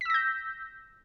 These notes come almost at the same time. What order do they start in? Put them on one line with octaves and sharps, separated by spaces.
B6 E6 A#6 G6